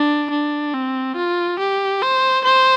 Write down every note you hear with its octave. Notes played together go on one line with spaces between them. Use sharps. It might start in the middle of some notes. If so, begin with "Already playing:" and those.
Already playing: D4
D4
C4
F4
G4
C5
C5